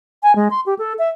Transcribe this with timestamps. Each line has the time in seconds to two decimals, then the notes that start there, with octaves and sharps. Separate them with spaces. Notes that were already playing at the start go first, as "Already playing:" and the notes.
0.23 G#5
0.36 G#3
0.51 C6
0.66 G4
0.79 A4
0.99 E5